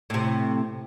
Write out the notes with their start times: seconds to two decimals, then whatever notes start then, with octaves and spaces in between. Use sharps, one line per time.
0.10 A2 C3